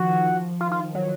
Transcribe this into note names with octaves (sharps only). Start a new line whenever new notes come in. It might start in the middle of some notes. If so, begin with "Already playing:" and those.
Already playing: D#3 F3 F#4
F3
D#3 F4
F4
F#3